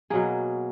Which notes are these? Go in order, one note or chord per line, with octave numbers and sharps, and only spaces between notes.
B2 F#3 A#3 G#4